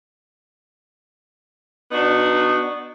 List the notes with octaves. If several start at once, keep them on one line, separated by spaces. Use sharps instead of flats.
B3 D4 D#4 F#4